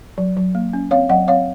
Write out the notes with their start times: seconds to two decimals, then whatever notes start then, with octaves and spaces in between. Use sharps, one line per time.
0.18 F#3
0.37 F#3
0.55 A#3
0.73 C#4
0.91 C4 C#5 F5
1.09 F#3 D#5 F#5
1.28 C4 C#5 F5